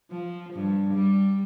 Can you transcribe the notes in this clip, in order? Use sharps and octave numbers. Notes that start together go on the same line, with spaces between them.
F3
G2
G3